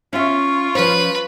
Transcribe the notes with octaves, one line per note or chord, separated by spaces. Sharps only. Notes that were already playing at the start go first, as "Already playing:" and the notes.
C#4 F4 E5 C#6
F3 C#4 B4 C5